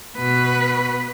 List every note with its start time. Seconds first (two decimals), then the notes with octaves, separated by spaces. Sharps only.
0.17 B2 B4